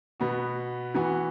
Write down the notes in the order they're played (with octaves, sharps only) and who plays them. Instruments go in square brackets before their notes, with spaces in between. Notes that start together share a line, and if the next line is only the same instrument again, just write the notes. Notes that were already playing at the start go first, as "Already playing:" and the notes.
[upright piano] B2 B3 F#4
E3 B3 F#4